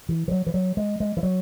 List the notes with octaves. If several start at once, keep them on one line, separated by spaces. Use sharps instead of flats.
E3
E3
F#3
E3
F#3
G#3
G#3
E3
F#3